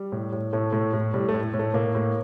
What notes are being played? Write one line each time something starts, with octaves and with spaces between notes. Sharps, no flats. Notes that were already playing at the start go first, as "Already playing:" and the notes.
Already playing: G3
A2
A2
A2 A3
A2
A2
A2 G3
A3
A2
A2
A3
A2 A#3
A2